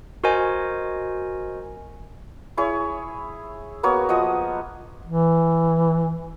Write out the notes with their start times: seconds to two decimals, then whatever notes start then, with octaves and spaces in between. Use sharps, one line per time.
0.24 F#4 A#4 C5 D#5 G#5
2.57 E4 G#4 C#5
3.83 A#3 B3 F#4 C#5
4.09 F3 D#5 F#5 D#6
5.06 E3